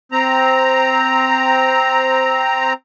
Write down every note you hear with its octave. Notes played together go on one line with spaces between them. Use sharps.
C4 A#5